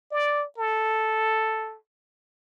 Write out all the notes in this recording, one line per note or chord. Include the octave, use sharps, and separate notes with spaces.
D5
A4